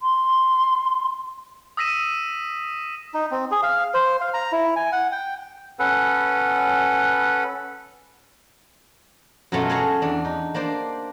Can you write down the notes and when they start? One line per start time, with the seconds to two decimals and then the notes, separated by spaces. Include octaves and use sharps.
0.02 C6
1.77 D#6 E6 A#6 B6 D#7 E7
3.14 D#4
3.31 C4
3.51 G#4
3.63 F5
3.94 C5
4.21 F5
4.34 A#5
4.52 E4
4.76 G#5
4.92 F#5
5.12 G5
5.79 C#4 A4 B4 F#5
9.52 F#2 B2 F#3 A3 C#4 F4
9.69 F#4 G#4 C#5 F5 A5 A#5
10.02 E2 D4
10.25 D#4
10.54 A#3 D4 C5 D5